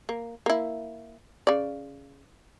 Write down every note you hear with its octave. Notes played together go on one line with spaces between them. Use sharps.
A#3
A#3 E4
C#3 D5